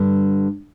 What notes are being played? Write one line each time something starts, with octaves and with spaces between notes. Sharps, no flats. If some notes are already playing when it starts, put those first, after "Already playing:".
Already playing: G2 D3 G3